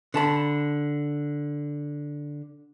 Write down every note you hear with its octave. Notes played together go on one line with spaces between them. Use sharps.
D3 A5 B5